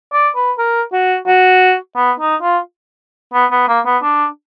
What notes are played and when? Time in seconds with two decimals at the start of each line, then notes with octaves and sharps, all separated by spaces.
0.13 D5
0.36 B4
0.58 A#4
0.93 F#4
1.27 F#4
1.96 B3
2.20 D#4
2.42 F4
3.34 B3
3.52 B3
3.68 A#3
3.85 B3
4.03 D4